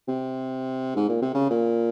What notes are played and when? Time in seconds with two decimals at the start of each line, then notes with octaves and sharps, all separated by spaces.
0.08 C3
0.96 G#2
1.09 A#2
1.22 C3
1.34 C#3
1.50 A#2